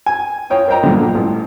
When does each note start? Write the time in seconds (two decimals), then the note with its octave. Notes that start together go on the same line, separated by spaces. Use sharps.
0.06 G#5
0.50 F4 C#5 G5 D#6
0.68 A#4 C5 D#5 G5 A#5
0.83 B1 G2 A#2 D3 F3 A#3
1.15 A1